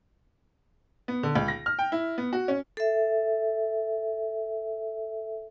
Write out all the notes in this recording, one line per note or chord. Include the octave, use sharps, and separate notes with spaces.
B3
D3
C#2
A#6
F6
G5
E4
B3
F#4
C#4
A4 E5